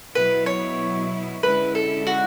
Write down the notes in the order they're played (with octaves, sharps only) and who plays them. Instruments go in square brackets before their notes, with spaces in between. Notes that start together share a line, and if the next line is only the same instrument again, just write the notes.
[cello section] B2 F#3 B3 E4 [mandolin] B4
[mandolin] C#5
[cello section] D3 G#3 C#4 E4 [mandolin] B4
[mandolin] A4
F#4